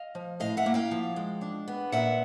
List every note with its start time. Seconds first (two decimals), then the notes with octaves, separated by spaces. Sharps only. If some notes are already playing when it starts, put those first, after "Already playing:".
Already playing: D#5 F5
0.15 F3
0.40 A2 D#5 F5
0.57 E5 F#5
0.66 A#3
0.74 F5 G5
0.91 F3
1.16 G#3
1.41 D4
1.68 B3
1.92 A#2 E5 F#5